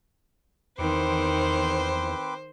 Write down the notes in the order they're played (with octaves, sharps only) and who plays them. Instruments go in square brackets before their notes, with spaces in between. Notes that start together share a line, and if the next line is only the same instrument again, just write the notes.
[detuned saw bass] E2 [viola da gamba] D#3 [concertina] C4 B4 D6 [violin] C5